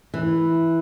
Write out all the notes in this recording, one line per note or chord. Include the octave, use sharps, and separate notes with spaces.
E3